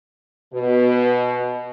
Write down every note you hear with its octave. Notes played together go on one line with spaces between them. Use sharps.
B2